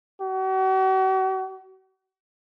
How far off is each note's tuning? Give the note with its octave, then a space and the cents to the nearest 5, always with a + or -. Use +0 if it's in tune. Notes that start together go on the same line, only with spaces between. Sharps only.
F#4 +40